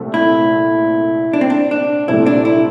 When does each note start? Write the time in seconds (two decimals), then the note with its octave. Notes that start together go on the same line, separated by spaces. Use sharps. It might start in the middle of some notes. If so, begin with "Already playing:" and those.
Already playing: C2 A#2 A3 C4
0.14 E4
1.33 D4
1.41 C4
1.50 D4
1.71 D4
2.08 C2 A#2 A3 C4 E4
2.26 D4
2.45 E4